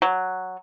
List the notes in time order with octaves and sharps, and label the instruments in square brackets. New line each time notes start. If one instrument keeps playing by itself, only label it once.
[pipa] F#3